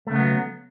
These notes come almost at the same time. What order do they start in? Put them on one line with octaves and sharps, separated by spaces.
A3 C#3 B3 F#3